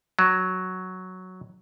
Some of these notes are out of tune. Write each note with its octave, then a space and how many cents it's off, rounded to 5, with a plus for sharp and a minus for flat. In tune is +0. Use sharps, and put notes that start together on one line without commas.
F#3 +0